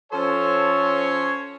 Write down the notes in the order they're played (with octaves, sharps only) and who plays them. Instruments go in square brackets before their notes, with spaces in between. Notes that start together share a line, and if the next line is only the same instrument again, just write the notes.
[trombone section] F3 A4 [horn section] C#4 C5 C#5